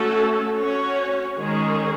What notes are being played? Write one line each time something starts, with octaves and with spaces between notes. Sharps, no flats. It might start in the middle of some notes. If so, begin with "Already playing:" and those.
Already playing: A3 C#4 F#4 A4
C#4 F#4 C#5
D#3 G#3 C#4 G#4